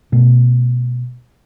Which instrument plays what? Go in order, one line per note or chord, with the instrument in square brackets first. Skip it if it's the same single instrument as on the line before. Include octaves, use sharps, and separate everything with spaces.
[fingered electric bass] B2 A3